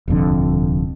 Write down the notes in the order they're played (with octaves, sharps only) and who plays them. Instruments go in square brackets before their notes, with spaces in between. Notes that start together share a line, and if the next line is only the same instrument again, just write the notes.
[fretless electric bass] D#1 C2 F2 D3